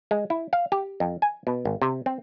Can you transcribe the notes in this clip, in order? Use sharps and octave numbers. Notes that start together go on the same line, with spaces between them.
G#3
E4
F5
G4
F2
G#5
B2
G#1
C3
C4